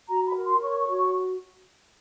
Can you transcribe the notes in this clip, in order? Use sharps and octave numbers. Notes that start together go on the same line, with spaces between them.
F#4 A#5
B5
A#4
C6
C#5 C#6
C#6
F#4
C#6